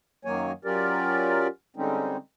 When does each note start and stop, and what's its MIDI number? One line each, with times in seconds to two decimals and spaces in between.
0.25 0.52 42
0.25 0.52 51
0.25 0.52 54
0.25 0.52 58
0.25 0.52 73
0.25 0.52 80
0.65 1.47 54
0.65 1.47 61
0.65 1.47 65
0.65 1.47 67
0.65 1.47 70
0.65 1.47 74
1.76 2.17 50
1.76 2.17 55
1.76 2.17 56
1.76 2.17 60
1.76 2.17 61
1.76 2.17 63